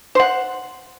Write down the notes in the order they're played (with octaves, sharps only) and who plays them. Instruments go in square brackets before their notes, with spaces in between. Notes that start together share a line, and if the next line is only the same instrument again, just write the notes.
[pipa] C5 F#5